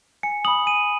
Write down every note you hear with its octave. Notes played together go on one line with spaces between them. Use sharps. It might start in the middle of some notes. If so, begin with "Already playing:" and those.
G#5 C#7
B5 D#6 F#7
G#5 D#7